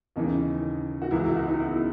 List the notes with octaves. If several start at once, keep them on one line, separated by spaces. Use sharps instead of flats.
D#2 C#3 E3 D#4
F#4
C#2 C#3 E3 E4
F#4
F#4
D#4
E4